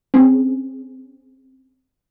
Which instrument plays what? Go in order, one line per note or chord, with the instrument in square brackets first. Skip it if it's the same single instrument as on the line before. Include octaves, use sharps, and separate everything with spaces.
[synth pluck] C4 C#4 G#4